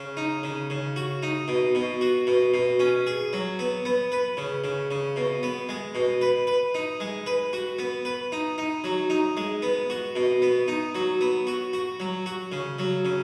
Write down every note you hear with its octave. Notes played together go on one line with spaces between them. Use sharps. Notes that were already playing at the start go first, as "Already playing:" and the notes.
Already playing: C#3
D#4
C#3
C#3
F#4
D#4
B2
B2
F#4
B2
B2
C#4
G#4
F#3
B3
B3
B4
C#3
C#3
C#3
B2
B3
G#3
B2
B4
B4
D#4
G#3
B4
F#4
B3
B4
D#4
D#4
F#3
D#4
G#3
B3
F#4
B2
B3
D#4
F#3
B3
F#4
F#4
F#3
F#4
C#3
F#3
C#3